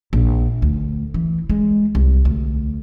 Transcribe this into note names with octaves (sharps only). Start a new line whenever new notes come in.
A#1
D2
E3
G#3
C2
D2